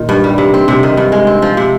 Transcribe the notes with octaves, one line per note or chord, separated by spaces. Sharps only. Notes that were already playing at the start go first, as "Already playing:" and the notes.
Already playing: A#2 D#3
G2
G3
C3
C4
C3
D#3
G2
G#3
C4
F3
C3